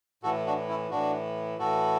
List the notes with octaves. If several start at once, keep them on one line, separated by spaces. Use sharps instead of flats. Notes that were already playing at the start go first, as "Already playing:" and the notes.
A2 E3 F#4 A4
D4 F#4
C#4 E4
A2 E3 D4 F#4
A2 E3 F#4 A4